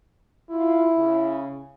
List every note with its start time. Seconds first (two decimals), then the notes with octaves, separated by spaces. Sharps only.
0.50 E4 F4
0.96 C#3